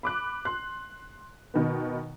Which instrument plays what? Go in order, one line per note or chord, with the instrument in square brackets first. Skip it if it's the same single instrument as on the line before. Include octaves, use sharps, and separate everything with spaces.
[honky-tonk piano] B5 D6 F#6
C6 F#6
B2 D#3 B3